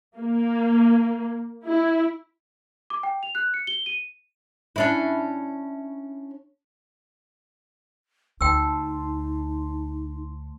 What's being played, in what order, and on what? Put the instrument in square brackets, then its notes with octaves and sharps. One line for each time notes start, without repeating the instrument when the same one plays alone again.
[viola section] A#3
E4
[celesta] D6
G5
F7
F#6
C#7
G7
D#7
[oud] C#4 D4 E4
[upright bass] D2 [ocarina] D#4 [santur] C5 A5 [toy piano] G5 E6